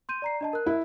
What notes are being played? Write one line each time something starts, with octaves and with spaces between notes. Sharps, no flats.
C6 G6 D#7
D5 A#5 C7
D4 D#5 A5
A#4 F#6
E4